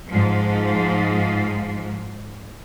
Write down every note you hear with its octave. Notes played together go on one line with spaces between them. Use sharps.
G#2 F3